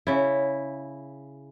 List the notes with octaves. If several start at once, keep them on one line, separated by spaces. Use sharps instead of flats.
C#3 E4